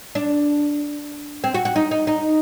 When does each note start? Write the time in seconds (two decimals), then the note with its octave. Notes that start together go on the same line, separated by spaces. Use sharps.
0.15 D4
1.44 C4
1.55 F#4
1.65 F#4
1.76 D#4
1.91 D#4
2.07 D#4